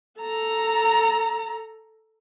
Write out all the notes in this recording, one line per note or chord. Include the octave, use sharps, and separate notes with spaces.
A4 A#5